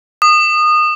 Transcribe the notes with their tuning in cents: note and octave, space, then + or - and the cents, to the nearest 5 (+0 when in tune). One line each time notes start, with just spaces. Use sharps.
D#6 -25